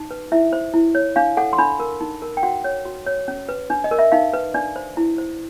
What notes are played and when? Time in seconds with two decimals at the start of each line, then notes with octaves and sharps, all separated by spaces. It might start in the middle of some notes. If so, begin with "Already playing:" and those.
Already playing: D#4
0.11 B4
0.32 E4 E5
0.53 C5
0.74 E4
0.95 C#5
1.16 D4 F5
1.37 A4 F#5
1.53 C6
1.58 D4 B5
1.80 A#4
2.01 D#4
2.22 A#4
2.37 G5
2.43 F#4 F#5
2.64 C#5
2.85 F#4
3.06 C#5
3.28 C#4
3.49 B4
3.70 D4
3.84 D#5
3.91 A#4
3.99 E5
4.12 D#4 F5
4.33 B4
4.54 D4 D5
4.76 C5
4.97 E4
5.18 C5